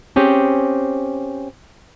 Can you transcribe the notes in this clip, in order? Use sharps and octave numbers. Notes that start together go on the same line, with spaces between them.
C4 C#4 G4 G#4